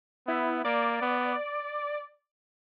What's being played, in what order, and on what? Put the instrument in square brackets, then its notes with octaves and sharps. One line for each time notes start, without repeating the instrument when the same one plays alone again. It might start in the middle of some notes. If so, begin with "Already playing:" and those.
[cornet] B3 [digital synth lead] E4
[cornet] A#3 [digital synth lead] D5
[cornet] B3